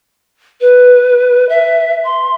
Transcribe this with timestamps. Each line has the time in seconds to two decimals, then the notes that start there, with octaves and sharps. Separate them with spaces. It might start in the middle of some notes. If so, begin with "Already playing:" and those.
0.61 B4
1.49 E5
2.05 C6